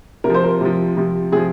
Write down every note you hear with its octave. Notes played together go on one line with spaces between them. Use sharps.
C3 A#4
F3 C5
A#4
C3 F3
C3 F3
C3 F3 G#4